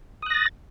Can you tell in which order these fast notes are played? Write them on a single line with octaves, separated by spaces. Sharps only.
D#6 F#6 A#6 A6